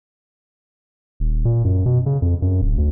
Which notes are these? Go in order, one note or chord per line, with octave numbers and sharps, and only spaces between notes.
D#1
A#2
F#2
B2
C#3
F2
F#2
D1
D2